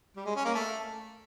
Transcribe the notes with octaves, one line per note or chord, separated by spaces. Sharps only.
G3
G#3
C#4
A#3
A3